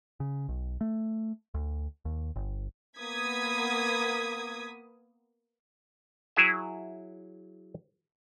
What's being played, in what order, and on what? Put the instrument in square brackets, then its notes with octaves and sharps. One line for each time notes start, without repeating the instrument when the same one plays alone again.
[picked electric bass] C#3
B1
A3
D2
D#2
G1
[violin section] A#3 B3 D#6 G#6 B6
[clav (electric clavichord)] F#3 E4 G#4 E5